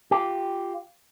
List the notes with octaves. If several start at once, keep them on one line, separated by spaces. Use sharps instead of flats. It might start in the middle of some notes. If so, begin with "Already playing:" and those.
F4 G4